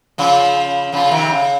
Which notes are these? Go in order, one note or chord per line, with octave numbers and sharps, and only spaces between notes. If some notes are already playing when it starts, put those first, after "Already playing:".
C#3 F3
C#3 F3
C3 D#3
C#3